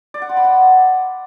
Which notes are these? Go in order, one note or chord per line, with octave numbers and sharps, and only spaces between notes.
D5
F#5
C6
B5
F#5